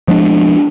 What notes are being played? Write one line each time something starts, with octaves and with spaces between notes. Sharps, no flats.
F3 G#3 B3 D4